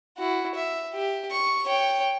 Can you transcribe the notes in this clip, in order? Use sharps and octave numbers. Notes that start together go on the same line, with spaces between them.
E4 F#4
E5
G4
C#6
C#5 G5